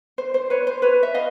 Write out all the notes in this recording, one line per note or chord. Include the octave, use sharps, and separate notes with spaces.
C5
C5
B4 C#5
C5
B4 C#5
E5
D#5 F5